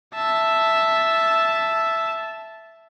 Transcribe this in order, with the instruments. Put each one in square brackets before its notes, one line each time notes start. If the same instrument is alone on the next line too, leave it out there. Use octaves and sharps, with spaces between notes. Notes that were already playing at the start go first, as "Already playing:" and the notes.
[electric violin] E5 A5